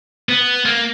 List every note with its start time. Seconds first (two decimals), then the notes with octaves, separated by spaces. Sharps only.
0.29 B3
0.66 A#3